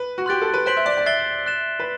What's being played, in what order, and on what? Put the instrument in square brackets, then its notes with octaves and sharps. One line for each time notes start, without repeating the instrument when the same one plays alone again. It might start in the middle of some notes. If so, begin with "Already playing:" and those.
Already playing: [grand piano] B4
F#4
[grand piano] G4 [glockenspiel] C6 F#6 A6 D7
[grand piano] A4
B4
[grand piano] C5 [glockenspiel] F#6 B6 D7 F#7
[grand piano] E5
D5
D5
[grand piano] E5 [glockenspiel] F#6 A6 C7 G7
[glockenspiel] F#6 A6 E7
[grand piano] B4